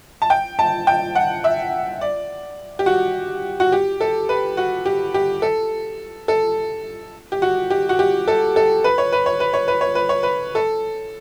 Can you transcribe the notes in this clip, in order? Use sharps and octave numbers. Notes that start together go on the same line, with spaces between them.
A5
G5
A5
G5
F#5
E5
D5
G4
F#4
F#4
G4
A4
B4
F#4
G4
G4
A4
A4
G4
F#4
G4
F#4
G4
A4
A4
B4
C#5
B4
C#5
B4
C#5
B4
C#5
B4
C#5
B4
A4